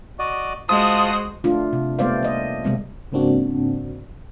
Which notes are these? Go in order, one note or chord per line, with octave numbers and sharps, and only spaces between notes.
F#4 D5 D#5
G#3 F4 F#4 C5 A5 D#6
A3 D4 F4
C3
G3 A3 B3 C5 D5 F5
A#3 D#5
C3 G3 G#3 A#3 C4
G#2 C#3 A#3 C4 D4 F#4